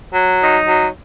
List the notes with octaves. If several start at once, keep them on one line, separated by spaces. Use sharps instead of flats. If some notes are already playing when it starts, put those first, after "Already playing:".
F#3
D#4
F#3